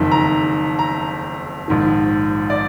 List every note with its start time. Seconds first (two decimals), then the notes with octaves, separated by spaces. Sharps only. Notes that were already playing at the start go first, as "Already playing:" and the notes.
Already playing: F#1 F2 D#3
0.11 A#5
0.79 A#5
1.68 A#1 G#2 D#3
2.50 D5